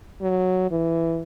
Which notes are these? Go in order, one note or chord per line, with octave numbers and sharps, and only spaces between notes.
F#3
E3